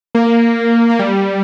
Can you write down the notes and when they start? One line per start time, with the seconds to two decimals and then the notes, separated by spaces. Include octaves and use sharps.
0.15 A#3
0.90 A#3
0.99 G3